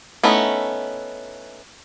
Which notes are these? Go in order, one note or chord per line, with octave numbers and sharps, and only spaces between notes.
A3 B3 C#4 D#4 E4